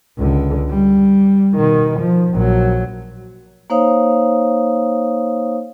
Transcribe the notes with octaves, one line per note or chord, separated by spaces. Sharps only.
C#2 D3
G3
B2 D#3
F3
A#1 F#3
A#3 D#4 C5 C#5 F5 D#6